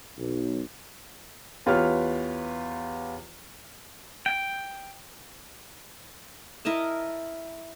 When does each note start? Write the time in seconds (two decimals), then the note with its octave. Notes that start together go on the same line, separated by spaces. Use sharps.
0.18 B1
1.66 E2 F4 G4 B4 C#5 F6
4.26 G5
6.65 E4 A#4 D#5 A5